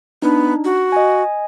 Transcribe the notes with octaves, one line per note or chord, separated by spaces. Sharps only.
B3 D4 D#4
F#4
D#5 G#5